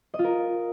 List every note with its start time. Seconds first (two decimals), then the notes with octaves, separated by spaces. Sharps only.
0.14 D#5
0.19 F4
0.24 A#4